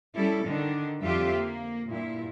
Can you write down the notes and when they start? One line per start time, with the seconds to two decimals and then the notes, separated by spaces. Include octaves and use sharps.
0.15 G3 C#4 E4 A4
0.45 D3 D#3 D4
1.01 F2 G3 F4 G4 E5
1.32 A#3
1.88 G2 A#2 E4